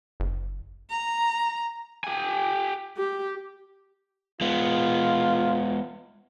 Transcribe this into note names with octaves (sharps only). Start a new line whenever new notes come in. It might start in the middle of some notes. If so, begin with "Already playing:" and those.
F#1
A#5
G4 G#5
G4
G#3 B3 F4